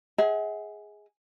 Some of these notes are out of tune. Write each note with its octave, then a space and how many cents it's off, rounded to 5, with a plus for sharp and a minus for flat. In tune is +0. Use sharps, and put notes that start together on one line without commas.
G#4 +0 D#5 +45 F#5 +0